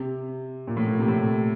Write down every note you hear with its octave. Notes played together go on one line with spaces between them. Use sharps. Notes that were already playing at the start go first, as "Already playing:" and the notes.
Already playing: C3
A#2
A2
A#2
C3
A2